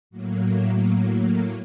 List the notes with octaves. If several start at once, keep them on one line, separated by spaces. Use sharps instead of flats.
A2 F#3 A#3
E5
E5
F5